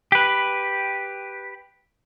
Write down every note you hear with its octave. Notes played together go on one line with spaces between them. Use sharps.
G4 B4